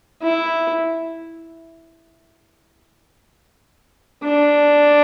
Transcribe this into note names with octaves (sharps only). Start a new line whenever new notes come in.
E4
D4